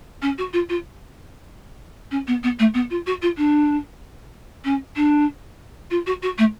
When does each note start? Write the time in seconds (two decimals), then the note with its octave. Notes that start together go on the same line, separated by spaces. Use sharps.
0.22 C#4
0.38 F#4
0.53 F4
0.69 F4
2.11 C#4
2.27 B3
2.43 B3
2.59 A3
2.74 B3
2.90 F4
3.06 F#4
3.22 F4
3.37 D4
4.64 C#4
4.96 D4
5.90 F4
6.06 F#4
6.22 F#4
6.38 A3